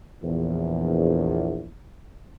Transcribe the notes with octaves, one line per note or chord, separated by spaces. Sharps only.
A#1 E2